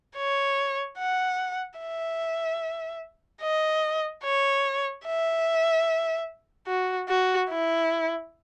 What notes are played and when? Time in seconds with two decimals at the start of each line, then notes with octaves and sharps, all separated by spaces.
0.17 C#5
0.98 F#5
1.80 E5
3.42 D#5
4.24 C#5
5.05 E5
6.67 F#4
7.08 F#4
7.50 E4